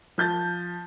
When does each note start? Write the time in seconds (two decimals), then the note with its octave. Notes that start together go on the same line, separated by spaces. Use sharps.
0.18 F3 G6 A6